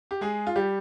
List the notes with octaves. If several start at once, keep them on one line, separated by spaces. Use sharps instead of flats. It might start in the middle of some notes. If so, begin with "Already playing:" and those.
G4
G#3 G#4
F4
G3 G4